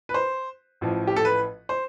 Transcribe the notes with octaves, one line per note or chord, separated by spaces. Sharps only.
B4
C5
A1 A2 F3
G4
A4
B4
C5